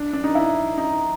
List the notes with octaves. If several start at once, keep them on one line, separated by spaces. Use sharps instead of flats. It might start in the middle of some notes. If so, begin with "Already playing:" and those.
Already playing: D4
D4
D#4
E4
D#4